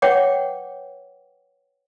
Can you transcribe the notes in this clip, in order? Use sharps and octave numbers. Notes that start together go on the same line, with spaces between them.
B4 C#5 F#5 G5 D6